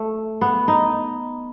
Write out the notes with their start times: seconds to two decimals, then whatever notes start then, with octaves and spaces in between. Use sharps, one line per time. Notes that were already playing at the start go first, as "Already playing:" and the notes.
Already playing: A3
0.41 B3
0.68 D#4